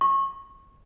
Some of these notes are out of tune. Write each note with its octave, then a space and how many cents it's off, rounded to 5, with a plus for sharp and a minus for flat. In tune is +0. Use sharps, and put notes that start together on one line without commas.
C#6 -30